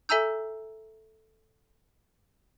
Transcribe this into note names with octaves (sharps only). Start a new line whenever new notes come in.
A4 E5 G#5 A#5 E6 G6